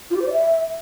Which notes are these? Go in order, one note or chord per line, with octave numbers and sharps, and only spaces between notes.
F4
G4
C5
D5
E5